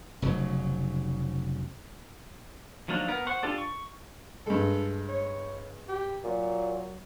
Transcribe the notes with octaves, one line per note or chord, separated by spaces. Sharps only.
F1 C#3 F#3
D#3 F3 F#3 A#3 D4
B3 A#4
C5 F#5 C#6
D4 F4 G4 A4 D5
C#6
G2 G#3 A4
C#5
G4
A#2 F#3